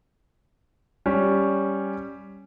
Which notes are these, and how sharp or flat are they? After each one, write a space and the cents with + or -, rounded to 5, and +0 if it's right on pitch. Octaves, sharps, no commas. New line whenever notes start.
G3 +0 C#4 +0